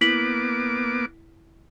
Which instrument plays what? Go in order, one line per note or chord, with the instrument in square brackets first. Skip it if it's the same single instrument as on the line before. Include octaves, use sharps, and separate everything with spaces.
[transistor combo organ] A#3 B3 D6 [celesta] E4 B6 F#7